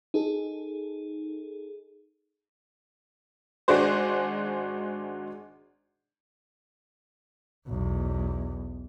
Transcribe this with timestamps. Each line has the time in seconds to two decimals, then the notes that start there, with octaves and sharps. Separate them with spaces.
0.14 D#4 G#4 A4
3.68 G#1 G#3 D4 F#4 C5
7.68 B1 E2